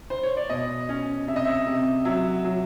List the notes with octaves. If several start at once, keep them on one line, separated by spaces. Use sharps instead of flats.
C5
C#5
D5
B2 D#5
C#4
C3 E5
D#5
E5
C3
F#3 E5
F#3